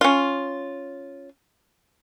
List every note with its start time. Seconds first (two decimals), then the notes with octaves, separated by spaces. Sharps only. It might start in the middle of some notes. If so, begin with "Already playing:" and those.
0.01 C#4 F4